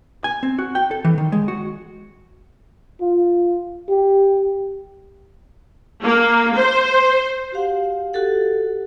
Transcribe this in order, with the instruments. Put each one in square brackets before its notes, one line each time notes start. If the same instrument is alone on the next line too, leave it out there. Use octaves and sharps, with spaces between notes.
[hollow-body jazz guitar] G#5
C4
F#4
G5
A4
E3
D#3
G#3
F#4
[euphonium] F4
G4
[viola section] A#3
C5
[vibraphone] F#4 G4 F5 F#5
F#4 G4 A4 F#5